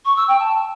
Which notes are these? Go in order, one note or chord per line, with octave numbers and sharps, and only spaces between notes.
C#6
E6
G5
A5